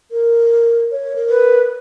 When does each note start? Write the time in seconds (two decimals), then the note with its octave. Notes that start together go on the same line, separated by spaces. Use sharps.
0.11 A#4
0.91 C#5
1.16 A#4
1.30 B4